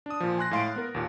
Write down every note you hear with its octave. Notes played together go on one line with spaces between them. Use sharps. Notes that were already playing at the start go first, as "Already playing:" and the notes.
D4 D#6
A#2 F3
G#5 C6 F#6 A#6
A2 G#3 F5 C6 A6 D7
B3 A#4
D#2 A#2